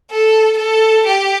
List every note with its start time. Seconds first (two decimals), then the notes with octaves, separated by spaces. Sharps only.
0.10 A4
0.58 A4
1.06 G4